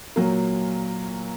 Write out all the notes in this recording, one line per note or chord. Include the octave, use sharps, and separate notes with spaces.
A#2 F#3 A#3